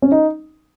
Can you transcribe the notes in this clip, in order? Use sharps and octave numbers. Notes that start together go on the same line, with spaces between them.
C#4
D#4